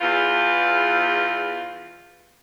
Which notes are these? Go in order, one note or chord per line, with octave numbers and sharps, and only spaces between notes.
E2 F4